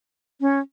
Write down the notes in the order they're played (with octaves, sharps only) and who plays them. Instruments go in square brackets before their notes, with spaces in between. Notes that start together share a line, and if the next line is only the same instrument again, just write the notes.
[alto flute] C#4